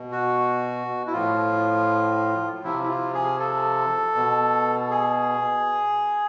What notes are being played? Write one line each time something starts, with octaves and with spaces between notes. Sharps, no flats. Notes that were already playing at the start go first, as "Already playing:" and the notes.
Already playing: B2
F#4
E4
A2 F3 F4
C3 F3 E4
E4
F4
G#4
A4
B2
G#4